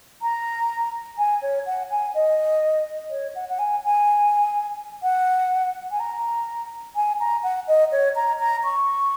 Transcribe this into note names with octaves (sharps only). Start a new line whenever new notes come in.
A#5
G#5
C#5
F#5
G#5
D#5
C#5
F#5
F#5
G#5
G#5
F#5
G#5
A#5
G#5
A#5
F#5
D#5
C#5
A#5
A#5
C#6